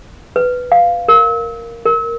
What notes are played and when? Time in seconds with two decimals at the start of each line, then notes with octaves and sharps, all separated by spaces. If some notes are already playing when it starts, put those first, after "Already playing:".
0.36 B4
0.72 F5
1.08 A#4
1.85 A#4